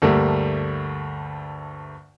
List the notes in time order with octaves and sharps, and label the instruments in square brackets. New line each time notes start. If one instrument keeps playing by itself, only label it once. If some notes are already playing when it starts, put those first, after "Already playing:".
[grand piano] D2 G2 G3 A3 A#3